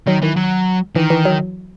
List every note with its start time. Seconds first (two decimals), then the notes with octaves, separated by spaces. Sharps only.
0.07 D#3 F#3
0.22 D#3 E3
0.36 F#3
0.95 D#3 E3
1.10 E3
1.25 F#3